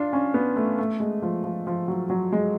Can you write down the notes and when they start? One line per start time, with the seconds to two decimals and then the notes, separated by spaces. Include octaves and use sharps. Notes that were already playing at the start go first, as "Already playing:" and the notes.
Already playing: D4 F4
0.13 C#4
0.34 B3
0.56 A3
0.79 A3
1.00 G#3
1.22 F3
1.44 F3
1.67 F3
1.88 F#3
2.10 F#3
2.32 G#3